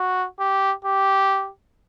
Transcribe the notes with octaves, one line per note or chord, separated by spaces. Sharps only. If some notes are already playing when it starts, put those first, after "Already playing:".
Already playing: F#4
G4
G4